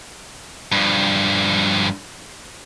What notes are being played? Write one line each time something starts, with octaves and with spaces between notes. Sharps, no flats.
G2 F3